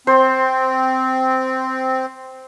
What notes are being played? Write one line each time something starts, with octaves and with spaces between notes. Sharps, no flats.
C4 C5